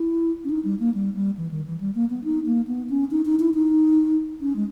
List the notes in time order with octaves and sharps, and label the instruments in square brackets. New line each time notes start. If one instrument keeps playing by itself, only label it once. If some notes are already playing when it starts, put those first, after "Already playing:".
Already playing: [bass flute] E4
C#4
D#4
G3
A#3
G3
G3
E3
D#3
E3
G3
A#3
B3
D#4
A#3
B3
C#4
D#4
D#4
E4
D#4
C#4
G#3